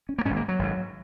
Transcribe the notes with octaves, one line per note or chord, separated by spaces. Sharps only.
C#4
A#3
G#2 C#4
G#1
A#3
F#3
G#1 G#2